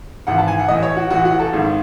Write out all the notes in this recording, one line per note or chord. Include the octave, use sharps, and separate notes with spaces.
G#1 G#2 E3 F#5
A5
G#5
F#5
A1 A2 E3 D#5
C#5
F#4
A1 A2 E3 F#4
F#4
A4
G#1 G#2 D#3